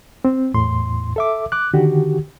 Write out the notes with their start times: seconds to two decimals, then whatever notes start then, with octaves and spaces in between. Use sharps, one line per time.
0.25 C4
0.54 E2 A2 C6
1.16 A4 E5 D6
1.52 D6 F#6
1.74 D3 D#3 F#4 G4